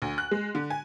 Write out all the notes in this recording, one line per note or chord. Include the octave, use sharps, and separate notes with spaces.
D2
F#6
G#3
D3
G#5